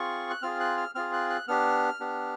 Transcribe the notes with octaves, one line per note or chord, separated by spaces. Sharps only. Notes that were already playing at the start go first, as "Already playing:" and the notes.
Already playing: C4 F4 G#4 C#6
F#6
C4 F4 G#4 F6
F#6
F6
C4 F4 G#4 F6
F#6
F#6
B3 D4 G4 F6
B3 D4 G4